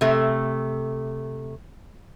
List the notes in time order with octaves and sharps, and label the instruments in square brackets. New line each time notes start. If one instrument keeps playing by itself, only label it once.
[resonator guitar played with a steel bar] C3 A3